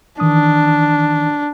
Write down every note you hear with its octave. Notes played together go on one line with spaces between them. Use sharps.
D#3 E3 D4 D#6